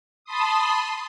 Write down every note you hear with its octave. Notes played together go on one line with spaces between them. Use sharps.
A5 B5 C6 D#6